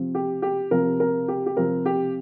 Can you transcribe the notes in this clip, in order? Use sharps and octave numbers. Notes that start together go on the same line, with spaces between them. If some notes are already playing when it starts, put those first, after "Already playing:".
Already playing: C3 F3 C4
G4
G4
C3 F3 C4 A#4
A#4
G4
G4
C3 F3 C4 A#4
G4